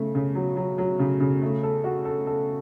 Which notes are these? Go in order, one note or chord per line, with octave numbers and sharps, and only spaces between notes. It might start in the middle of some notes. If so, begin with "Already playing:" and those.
Already playing: C#3 A3
C#3
F#3
F#3
F#3
C#3
C#3
A3
A4
F#4
A4
A4